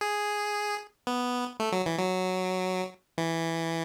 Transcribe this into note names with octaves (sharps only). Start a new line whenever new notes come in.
G#4
B3
A3
F#3
E3
F#3
E3